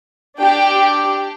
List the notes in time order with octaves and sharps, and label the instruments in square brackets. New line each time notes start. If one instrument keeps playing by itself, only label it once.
[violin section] D4 G4 G5